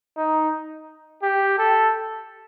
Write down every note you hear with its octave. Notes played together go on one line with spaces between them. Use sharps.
D#4
G4
A4